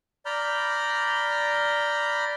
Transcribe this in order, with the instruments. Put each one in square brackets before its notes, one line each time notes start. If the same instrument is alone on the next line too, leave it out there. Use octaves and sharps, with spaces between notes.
[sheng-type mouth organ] D5 A#5 B5 F6 G6